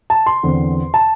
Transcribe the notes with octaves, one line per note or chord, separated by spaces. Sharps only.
A5
C6
E2 D3 C4
A5